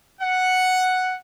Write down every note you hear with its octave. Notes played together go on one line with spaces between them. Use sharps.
F#5